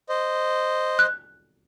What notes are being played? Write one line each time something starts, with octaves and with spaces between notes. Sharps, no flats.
C5 D#5
F#6